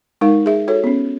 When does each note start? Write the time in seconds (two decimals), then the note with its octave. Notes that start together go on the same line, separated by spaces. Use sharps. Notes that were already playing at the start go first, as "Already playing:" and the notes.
0.21 G#3 D#4 A#4 F5
0.46 G#4 E5
0.68 F#4 A4 C#5
0.84 B3 C#4